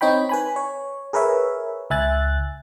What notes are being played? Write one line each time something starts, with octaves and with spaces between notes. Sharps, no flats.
C4 D#4 C#5 G5 B5
B4 G#5 B5
C#5
G#4 A#4 B4 C#5 E5
C#2 E5 G#5 F#6 A6